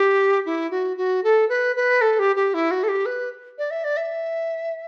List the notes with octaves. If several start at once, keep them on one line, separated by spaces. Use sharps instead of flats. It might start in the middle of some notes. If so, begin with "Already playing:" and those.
Already playing: G4
E4
F#4
F#4
A4
B4
B4
A4
G4
G4
E4
F#4
A4
G4
B4
D5
E5
D5
E5